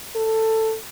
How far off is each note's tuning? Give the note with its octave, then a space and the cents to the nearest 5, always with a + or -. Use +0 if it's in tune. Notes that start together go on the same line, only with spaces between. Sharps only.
A4 +10